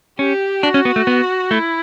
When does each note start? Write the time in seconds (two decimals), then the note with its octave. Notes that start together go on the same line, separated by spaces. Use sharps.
0.19 C#4 G4
0.63 D4 F#4
0.74 C#4
0.85 B3
0.96 A3
1.07 B3
1.51 A3 E4